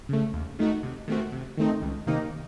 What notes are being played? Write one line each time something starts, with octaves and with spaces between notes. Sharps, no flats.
C#3 A3
D#2
D#3 A3 D#4 F#4
C3
D#3 A3 C4 F#4
C3
D#3 A3 C4 D#4
C#2
C3 D#3 A#3 D#4